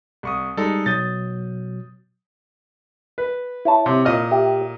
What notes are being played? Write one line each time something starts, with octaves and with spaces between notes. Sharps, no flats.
C2 C#6 D#6
G3 G#3 D#4 A4
B2 F#3 D#6 G6 A6
B4
E4 C#5 A5
C3
A#2 D#5 F6
G4 E5